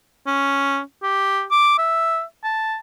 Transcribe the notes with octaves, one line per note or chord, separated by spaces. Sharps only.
C#4
G4
D6
E5
A5